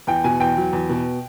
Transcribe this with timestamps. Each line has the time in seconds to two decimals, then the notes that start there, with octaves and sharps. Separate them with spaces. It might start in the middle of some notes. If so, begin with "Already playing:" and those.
0.07 E2 G5
0.24 B2 G#5
0.40 E2 G5
0.57 F#3
0.73 E2
0.89 B2